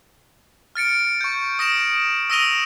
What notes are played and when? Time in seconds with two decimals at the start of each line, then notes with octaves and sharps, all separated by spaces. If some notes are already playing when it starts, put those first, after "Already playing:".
0.75 F6 A6 C#7 D7
1.21 C#6 G6
1.59 D#6 A#6 D7 E7
2.30 D#6 E6 A#6 D#7 F7 G7